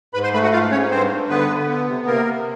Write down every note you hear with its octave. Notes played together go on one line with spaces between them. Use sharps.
G#2 B4 B5
C5 C6
A3 B4 B5
F#4 F#5
G#2 F4 F5
G#2 C#4 C#5
G2 C4 C5
G2
D3 B3 B4
D3
B3
C3
C3 A#3 A#4
C3